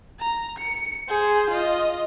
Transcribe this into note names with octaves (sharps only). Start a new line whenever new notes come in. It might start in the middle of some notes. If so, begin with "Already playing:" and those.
A#5
C#7
G#4 C5
F4 D#5